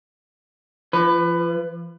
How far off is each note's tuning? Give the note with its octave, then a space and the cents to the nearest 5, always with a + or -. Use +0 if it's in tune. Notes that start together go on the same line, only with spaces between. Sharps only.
F3 -35 B4 +20